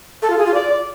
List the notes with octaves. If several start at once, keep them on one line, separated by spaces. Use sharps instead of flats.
A4
F4
G#4
F4
D5